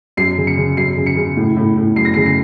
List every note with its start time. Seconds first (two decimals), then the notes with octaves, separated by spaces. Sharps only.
0.17 F#2 C7
0.37 C#3
0.47 C#7
0.58 C#3
0.77 F#2 C7
0.97 C#3
1.06 C#7
1.16 C#3
1.37 A2
1.56 A2
1.77 A2
1.96 F#2 C7
2.05 A#6
2.14 C#3 C7
2.26 C7